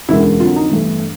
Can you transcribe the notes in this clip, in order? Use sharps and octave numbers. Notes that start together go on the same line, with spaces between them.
E1 D2 C#3 E3 G#3 E4
F2 D3 F#3 F4
D#4
G1 G2 E3 A3